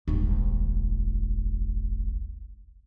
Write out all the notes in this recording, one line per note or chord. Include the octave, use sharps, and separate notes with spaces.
D#1 G#1